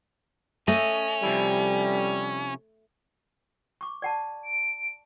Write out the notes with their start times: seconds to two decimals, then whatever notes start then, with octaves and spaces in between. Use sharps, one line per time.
0.68 A3 C#4 D#5
1.23 C3 F3 G3 E4
3.81 C#6 D6
4.02 D5 F#5 A5
4.43 D7